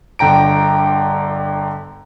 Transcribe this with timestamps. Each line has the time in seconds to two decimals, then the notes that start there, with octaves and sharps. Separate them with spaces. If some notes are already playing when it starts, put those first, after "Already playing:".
0.19 G1 D3 G5 A#5 D7